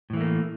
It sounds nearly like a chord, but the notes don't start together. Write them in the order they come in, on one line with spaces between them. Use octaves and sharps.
A2 E3 A3 A#3